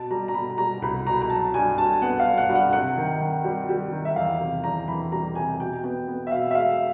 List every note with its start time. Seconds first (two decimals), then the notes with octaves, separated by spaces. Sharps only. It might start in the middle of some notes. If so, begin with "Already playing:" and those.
Already playing: B2 A5
0.11 G3 A#5
0.28 A#5
0.34 B2 B5
0.58 G3 A#5
0.82 C2 B5
1.06 B2 A#5
1.13 B5
1.21 A#5
1.30 F#3 A5
1.54 G2 G#5
1.78 G2 A5
2.02 B3 F#5
2.20 F5
2.25 G2
2.38 F#5
2.49 G2
2.55 F#5
2.73 C3 F#5
2.97 D#3
3.21 D#3
3.44 G3
3.69 G3
3.92 D#3
4.05 E5
4.16 E2 F5
4.41 C3
4.64 E2 A#5
4.88 E3 B5
5.12 G3 A#5
5.35 C3 G#5
5.60 B2 G5
5.84 B3 G5
6.07 B3
6.27 E5
6.31 B2 F5
6.51 E5
6.55 G#3 F5